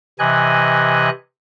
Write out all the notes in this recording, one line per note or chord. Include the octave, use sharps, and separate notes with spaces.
C3 E3 D#5 G#5 F#6